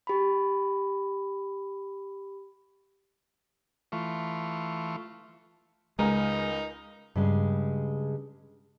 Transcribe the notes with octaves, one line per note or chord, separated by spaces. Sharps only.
G4 B5
E3 A3 F4 C#6
C#2 G#3 D#4 A#4 G#5
G2 C#3 G#3